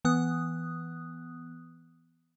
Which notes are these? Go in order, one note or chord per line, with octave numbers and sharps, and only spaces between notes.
E3 B3 D#6 F#6